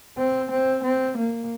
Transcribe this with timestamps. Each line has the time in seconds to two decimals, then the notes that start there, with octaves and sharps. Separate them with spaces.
0.17 C4
0.50 C4
0.83 C4
1.17 A#3